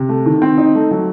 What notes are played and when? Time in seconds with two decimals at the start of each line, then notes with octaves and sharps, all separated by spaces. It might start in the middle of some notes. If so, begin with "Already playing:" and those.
Already playing: C3
0.09 A3
0.26 D#3
0.42 C4
0.58 D#4
0.75 A3
0.91 F#3